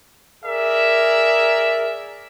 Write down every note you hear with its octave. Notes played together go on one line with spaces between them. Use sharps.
G#4 A#4 D5 E5